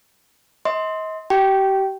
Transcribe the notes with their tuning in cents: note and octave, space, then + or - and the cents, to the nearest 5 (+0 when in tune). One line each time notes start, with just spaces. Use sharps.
D#5 +35 C6 +0
G4 -35 G5 -15